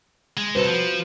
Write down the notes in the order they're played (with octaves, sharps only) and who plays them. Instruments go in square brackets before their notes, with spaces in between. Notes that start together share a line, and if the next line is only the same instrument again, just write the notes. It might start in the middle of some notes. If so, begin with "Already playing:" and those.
[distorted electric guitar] G#3
[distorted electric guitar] C2 A4 [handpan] F#4 B4 C5
[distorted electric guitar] F3